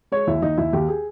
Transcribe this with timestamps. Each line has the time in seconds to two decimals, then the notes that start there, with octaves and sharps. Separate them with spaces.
0.12 G#3 C#5
0.27 D#2 E4
0.42 D#2 D#4
0.58 D#2 E4
0.73 D#2 G4
0.88 G#4